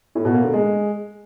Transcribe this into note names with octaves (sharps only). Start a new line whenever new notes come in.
A2
B2
A#3
D3
G#3